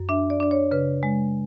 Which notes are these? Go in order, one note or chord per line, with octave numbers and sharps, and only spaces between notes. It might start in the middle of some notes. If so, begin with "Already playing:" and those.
Already playing: F#2
D4 E5
D5
D4 D5
C#5
C#3 B4
G#3